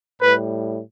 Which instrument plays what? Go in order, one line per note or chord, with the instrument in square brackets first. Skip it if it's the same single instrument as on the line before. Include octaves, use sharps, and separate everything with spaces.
[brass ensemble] A2 G3 B4